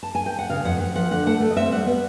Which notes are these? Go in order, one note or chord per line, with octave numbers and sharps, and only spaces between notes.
A5
G#5
G5
F#5
C#3 F5
F2 F#5
F3 F#5
F3 F#5
D3 F#5
A3 F#5
A3
D#5
C4 E5
G3 F#5
B3